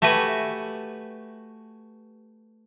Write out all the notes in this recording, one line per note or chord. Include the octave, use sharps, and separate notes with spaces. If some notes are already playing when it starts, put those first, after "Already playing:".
A3 F#4 G4 B4 G#5